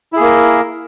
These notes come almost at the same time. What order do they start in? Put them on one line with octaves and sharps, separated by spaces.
E4 G#4 A#3 A#4